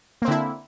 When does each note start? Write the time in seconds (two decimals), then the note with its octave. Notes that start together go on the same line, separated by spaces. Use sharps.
0.22 A#3
0.25 C4
0.28 D3
0.31 E4